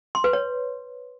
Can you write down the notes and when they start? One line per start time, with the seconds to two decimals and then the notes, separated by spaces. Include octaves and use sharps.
0.15 C6
0.24 B4
0.33 C#5